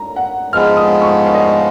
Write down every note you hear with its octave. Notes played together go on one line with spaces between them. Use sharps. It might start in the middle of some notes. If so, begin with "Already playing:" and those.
Already playing: A#5
F#5
G#2 F3 G#3 B3 F6
D#6
C#6
F5
D#5
F5